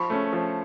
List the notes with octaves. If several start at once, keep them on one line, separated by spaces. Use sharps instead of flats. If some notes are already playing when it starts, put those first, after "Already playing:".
Already playing: F3 B5 C#6
A3 C#4
F3